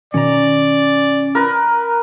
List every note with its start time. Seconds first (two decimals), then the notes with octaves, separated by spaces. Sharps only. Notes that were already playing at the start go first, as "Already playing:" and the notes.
0.14 B2 D#3 C#4 D5 A#5
1.35 A#4 B4